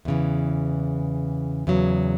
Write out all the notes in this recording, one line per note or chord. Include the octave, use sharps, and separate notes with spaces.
E2 C#3 E3
E2 C#3 F#3